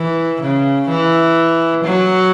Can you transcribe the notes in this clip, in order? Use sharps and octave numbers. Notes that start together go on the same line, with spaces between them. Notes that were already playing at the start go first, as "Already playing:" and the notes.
Already playing: E3
C#3
E3
F#3